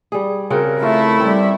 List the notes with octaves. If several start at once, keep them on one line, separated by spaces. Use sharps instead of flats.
G3 G#4
C#3 C4 F#4 A#4
A3 E4 F4
G3 C4